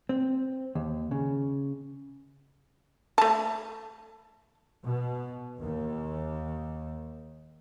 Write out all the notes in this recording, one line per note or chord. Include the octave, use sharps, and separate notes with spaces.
C4
D#2
C#3
A3 A5
B2
D#2